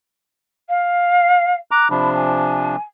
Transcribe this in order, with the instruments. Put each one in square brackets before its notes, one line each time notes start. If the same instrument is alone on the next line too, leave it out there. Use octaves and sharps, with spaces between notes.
[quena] F5
[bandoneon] A#5 D6 [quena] F#6
[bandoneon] C3 F3 D4 [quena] B5
[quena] G#5